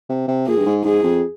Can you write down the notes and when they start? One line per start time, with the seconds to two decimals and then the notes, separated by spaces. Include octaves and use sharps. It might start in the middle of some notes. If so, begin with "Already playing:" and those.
0.09 C3
0.28 C3
0.47 A#2 G#4
0.57 G2
0.66 G#2
0.85 G#2 G#4
1.03 F2